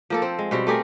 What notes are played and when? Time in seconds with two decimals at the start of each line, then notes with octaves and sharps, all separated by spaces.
0.10 F3 A#3 A4
0.22 C4 C5
0.39 G#3
0.51 B2 G3 C4
0.67 A3 G4 G#4 A#4